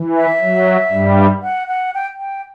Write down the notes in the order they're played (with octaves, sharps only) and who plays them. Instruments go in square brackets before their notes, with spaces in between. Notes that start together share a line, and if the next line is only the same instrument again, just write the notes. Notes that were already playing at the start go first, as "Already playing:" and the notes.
Already playing: [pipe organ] E3
[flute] E5
[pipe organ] F#3
G2 G3
[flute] F#5
F#5
G5
G5